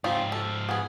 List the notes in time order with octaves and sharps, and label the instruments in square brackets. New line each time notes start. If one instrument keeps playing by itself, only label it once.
[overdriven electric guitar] G#2 F3 [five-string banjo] C4 D#4 F4
[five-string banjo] A4
B3 G#4